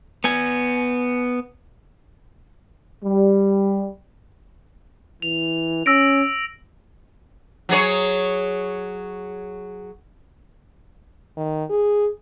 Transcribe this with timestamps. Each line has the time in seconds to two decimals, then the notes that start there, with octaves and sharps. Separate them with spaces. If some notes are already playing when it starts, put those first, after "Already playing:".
0.24 B3 G#5
3.04 G3
5.22 E3 F7
5.86 C#4 E6 A#6 D7
7.69 F#3 G#4 C#5
11.37 D#3
11.70 G#4